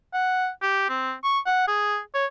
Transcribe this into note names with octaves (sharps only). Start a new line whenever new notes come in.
F#5
G4
C4
C#6
F#5
G#4
C#5